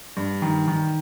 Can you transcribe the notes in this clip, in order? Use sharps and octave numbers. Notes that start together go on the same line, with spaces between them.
G2
D#3
D#3